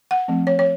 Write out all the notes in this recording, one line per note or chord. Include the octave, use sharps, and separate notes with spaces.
F#5
F3 A3 C4
C#5
C#5